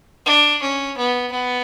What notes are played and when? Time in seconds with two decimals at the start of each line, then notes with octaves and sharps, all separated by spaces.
0.26 D4
0.62 C#4
0.97 B3
1.31 B3